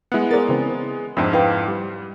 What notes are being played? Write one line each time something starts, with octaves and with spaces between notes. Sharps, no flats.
G#3 B3 E4 F#5
G#4 A#4 C5 D5 A6
C#3 E3 C4
F2 G#2 C4 D4 E5 B5
E4 B4 F5 G5
G3